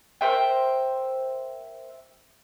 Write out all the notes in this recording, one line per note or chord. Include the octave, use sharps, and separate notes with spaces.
A#4 C5 E5 G5